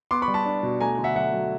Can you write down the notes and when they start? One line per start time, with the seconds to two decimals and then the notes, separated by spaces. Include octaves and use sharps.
0.11 B3 C6 D6
0.22 B5 C#6
0.28 G3
0.34 A5 B5
0.45 D4
0.63 B2
0.81 A3 G#5 A#5
0.98 D3
1.04 E5 F#5
1.16 F#3 E5 F#5
1.33 F#3